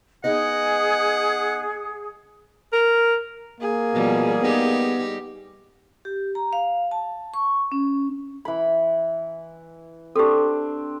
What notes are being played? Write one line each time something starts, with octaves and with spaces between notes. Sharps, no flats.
B3 D#4 G#4 D#5 F#5
A#4
A#3 G#4
B2 F3 G3
G3 B3 D#4 G4
G4
A#5
F5
A5
C#6
C#4
E3 B5
C4 D4 G4 A4